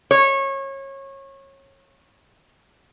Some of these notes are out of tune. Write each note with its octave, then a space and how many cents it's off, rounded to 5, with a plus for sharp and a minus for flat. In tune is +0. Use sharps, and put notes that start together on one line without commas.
C#5 -25